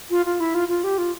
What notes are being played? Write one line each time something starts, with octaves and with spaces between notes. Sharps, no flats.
F4
F4
E4
F4
F4
G4
F4